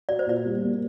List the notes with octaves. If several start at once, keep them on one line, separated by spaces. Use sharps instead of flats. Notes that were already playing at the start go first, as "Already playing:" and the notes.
F#4 D5
C5
A#2 D5
G3
A#3